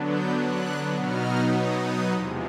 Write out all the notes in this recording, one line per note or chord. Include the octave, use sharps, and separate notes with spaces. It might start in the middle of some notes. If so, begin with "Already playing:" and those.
Already playing: D3 F#3 B3 D4
G6
F#6
B2 F#3 B3 D#4 F6
D#6
D#6
E2 C3 F3 G#3